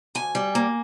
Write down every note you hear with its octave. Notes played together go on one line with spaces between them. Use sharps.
D2 G#5
G3
A#3